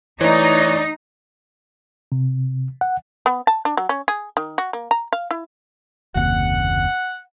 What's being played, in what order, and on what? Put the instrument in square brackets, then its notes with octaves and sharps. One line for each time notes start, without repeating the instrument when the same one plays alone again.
[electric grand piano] E3 A3 [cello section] D#4 [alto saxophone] C#5 [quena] D5
[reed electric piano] C3
F#5
[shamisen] B3
A5
D4
F#3
C#4
G#4
D#3
F#4
A#3
A#5
F5
E4
[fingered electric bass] F#1 D#2 C3 [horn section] F#5